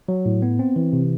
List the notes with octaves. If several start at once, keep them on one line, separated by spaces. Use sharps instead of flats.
F#3
A2
B3
C4
E3
C3